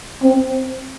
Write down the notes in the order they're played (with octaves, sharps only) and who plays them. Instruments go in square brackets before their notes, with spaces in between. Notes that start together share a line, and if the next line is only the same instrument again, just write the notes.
[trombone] C4